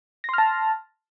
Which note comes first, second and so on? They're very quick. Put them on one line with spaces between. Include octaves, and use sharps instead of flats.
A#6 C6 F6 A5